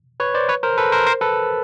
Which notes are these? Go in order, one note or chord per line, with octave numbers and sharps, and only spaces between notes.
B4 C#5
C5 D5
B4 C#5
A#4 C5
A4 B4
A#4 C5
A#4 C5
A4 B4